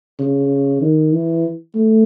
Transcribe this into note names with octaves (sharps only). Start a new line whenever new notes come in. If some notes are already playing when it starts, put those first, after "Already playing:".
C#3
D#3
E3
A3